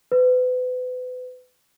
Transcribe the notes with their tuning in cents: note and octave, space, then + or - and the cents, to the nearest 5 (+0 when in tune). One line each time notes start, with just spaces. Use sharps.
B4 +35